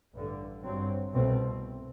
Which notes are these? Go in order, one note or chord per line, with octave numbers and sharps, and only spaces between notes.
A1 G2 D3
G2 F#3 C4
C2 B2 A3 C4